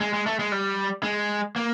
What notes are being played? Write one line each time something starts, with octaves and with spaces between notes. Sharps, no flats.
G#3
G#3
A3
G#3
G3
G#3
A#3